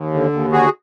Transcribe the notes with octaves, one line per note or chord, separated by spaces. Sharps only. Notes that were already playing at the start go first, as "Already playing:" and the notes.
Already playing: D#2
D3
D#2
D3 F#4 G#4